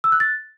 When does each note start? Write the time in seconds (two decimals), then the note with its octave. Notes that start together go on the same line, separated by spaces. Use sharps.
0.04 E6
0.12 F#6
0.20 A6